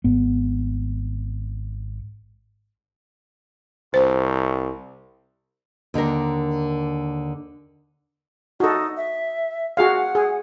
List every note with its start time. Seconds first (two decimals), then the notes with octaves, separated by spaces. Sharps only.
0.04 G#1 B3
3.94 C2 C5
5.94 D#2 D3 D4 A#4
8.60 D#4 F#4 A4
8.97 E5
9.77 F#4 G#4 F5 F#5
10.15 G#4